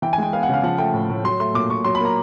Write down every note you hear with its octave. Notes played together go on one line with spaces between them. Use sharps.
E3 G5
G#5
G#3 G5
B3 F5
F#5
C#3 F5
F3 F#5
A3 G5
A2
A2
F#3 C6
A3 C6
A#2 D6
A#2 C#6
F#3 C6
B5
A#3 A#5